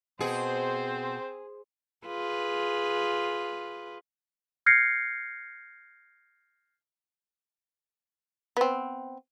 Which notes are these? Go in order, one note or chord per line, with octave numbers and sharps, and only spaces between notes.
B2 C4 G#4 C5
F4 G#4 B4
F6 G6 G#6 A#6 C7 C#7
B3 C4